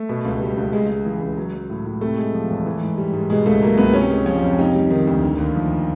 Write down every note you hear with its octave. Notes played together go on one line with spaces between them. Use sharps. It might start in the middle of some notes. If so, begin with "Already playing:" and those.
Already playing: A3
B2
C#2
G3
C#2
C#3 G#3
G#3
E3
C#2
F#3
F#3
A2
A2
C3 A3
G#3
F3
E2
E3
G#2
G3
G#2
B2 G#3
C#2 A3
F#3 A#3
C#2 B3
C3 C#4
G#3
F3 C#4
F2
C3 D#4
G3
D#3
D2
D3
D#2
F3